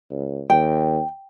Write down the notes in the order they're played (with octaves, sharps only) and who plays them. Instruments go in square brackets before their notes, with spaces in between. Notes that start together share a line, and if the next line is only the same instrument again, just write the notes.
[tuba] C#2
[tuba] D#2 [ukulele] G5